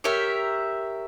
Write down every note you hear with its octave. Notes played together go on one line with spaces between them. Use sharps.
G4 A#4 C#5 E5